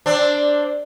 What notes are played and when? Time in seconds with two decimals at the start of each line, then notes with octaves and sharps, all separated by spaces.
0.06 C4 D4